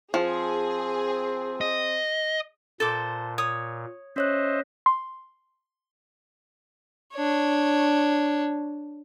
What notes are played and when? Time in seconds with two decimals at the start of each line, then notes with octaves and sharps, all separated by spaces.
0.14 F3 C4 G#4
1.61 D#5
2.80 A#2 A4 C5 D6
3.38 C#5 D#6
4.16 C#4 C5 C#5 D#5 E5 F#6
4.86 C6
7.14 D4 C#5